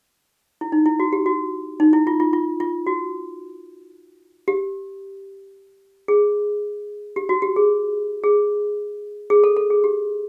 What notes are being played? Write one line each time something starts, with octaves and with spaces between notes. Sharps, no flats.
E4
D#4
E4
F#4
G4
F#4
D#4
E4
F4
F4
F4
F4
F#4
G4
G#4
G4
F#4
G4
G#4
G#4
G#4
A4
A4
G#4
G4